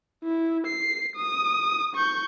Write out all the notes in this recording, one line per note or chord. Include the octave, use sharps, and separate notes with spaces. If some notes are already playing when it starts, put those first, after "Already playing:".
E4
C7
D#6
C#6 G6